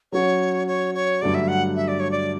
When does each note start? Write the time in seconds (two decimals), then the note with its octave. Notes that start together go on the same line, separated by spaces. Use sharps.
0.12 F#3 C#4 F#4 C#5
0.67 C#5
0.95 C#5
1.22 G2 D3 F#3 A3 D5
1.35 E5
1.48 F#5
1.76 E5
1.88 D5
2.00 C#5
2.11 D5